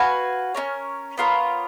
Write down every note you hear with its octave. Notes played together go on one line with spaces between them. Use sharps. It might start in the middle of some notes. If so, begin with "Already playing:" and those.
Already playing: F#4 B4 F5 G#5
C#4 F4 A#4 C#5
B3 F4 A#4 C#5